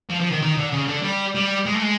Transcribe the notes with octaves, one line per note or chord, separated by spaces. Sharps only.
F3
F3
D#3
D#3
D3
C#3
D3
G3
G3
G#3
A3
G#3